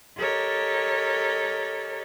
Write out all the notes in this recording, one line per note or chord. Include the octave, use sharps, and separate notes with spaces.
G4 A4 A#4 C#5 D#5